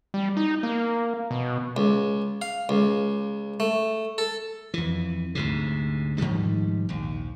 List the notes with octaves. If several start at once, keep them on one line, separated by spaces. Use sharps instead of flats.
G3
D#4
A#3
B2
C#2
F5
C#2
A3
A4
F2 E3
D2 G#2 C3
G#2 D#3 F3 G3
A#1 D#2